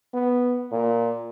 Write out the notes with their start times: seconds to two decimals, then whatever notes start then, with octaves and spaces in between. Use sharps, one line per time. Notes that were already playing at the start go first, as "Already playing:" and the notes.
0.14 B3
0.72 A#2